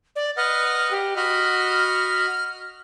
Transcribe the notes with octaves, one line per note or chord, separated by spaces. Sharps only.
D5
B4 D#5 F#5 F6
G4
F#4 D#5 B5 F6